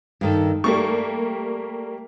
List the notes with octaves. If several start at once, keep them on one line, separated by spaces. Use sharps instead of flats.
G2 D#3 A4
G3 A3 A#3 C#6